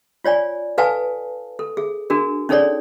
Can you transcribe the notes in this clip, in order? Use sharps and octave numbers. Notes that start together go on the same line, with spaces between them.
F4 C#5 D5 G#5
A4 B4 F5 G#5 A5
A4
G#4
D4 F#4 G#4 A#4
C#4 D#4 G#4 A4 C#5 D5